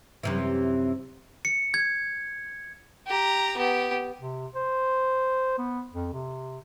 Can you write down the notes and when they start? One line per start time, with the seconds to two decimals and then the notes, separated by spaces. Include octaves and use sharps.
0.23 F#2 C3 E3
1.45 C#7
1.74 G#6
3.07 G4 A#5
3.57 B3 G4
4.20 C3
4.55 C5
5.58 B3
5.94 F2
6.13 C3